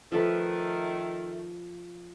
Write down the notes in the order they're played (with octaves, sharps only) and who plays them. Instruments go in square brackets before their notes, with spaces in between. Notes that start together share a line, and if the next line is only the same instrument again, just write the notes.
[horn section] D#3 A3 [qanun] F3 A4 B4